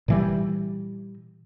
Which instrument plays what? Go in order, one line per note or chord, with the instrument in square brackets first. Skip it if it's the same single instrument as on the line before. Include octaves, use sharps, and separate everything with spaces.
[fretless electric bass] A#2 E3 G3